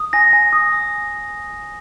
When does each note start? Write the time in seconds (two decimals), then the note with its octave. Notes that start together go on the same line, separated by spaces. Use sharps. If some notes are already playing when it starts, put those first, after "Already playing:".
Already playing: D#6
0.13 G#5 A#6
0.33 G#5
0.53 D#6
0.72 D#6